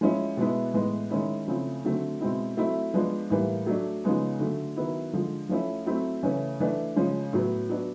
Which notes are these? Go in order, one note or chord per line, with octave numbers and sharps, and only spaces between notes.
F3 G#3 C#4 E4
B2 G#3 B3 E4
A2 E3 G#3 B3
D#3 G#3 C#4 E4
C#3 F3 A3 C4 E4
D3 F#3 A3 C4
B2 G#3 C4 E4
F#3 A3 C4 E4
F3 G#3 B3 D4
A2 E3 G3 A#3
F#3 A3 D4
C#3 F3 G#3 B3 D#4
D3 F#3 A3
D#3 F#3 B3 E4
D3 F3 G#3
F3 A3 C#4 E4
F#3 A3 C4 E4
C#3 E3 A3 C#4
E3 A3 D4
C#3 F3 G#3 C#4
A2 F#3 B3
F#3 B3 D4